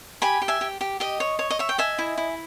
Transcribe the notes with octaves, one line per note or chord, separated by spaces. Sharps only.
G4 G#5 B5
G4
E5 G#5
G4
G4
G4 D#5
C#5
C#5
D#5
C#5 E5
G5
D#5 E5 G#5
E4
E4